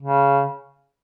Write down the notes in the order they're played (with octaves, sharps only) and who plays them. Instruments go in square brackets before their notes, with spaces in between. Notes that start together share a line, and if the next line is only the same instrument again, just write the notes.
[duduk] C#3